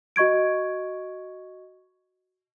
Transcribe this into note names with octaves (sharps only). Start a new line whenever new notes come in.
F#4 D#5 C#6 G#6 D7